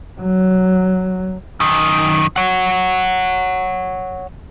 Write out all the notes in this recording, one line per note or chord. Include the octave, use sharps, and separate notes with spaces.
F#3
F#2 D#3
C#5 F#5